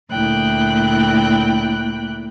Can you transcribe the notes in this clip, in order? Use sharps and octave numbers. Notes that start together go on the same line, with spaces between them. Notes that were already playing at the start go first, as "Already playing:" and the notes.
D2 A#2 E4 G5 F#6